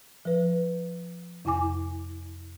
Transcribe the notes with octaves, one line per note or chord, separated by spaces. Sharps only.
F3 B4
F2 C3 E4 G#5 D6